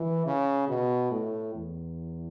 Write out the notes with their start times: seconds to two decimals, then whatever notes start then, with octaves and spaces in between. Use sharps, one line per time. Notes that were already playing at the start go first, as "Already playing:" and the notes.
Already playing: E3
0.26 C#3
0.69 B2
1.11 A2
1.55 E2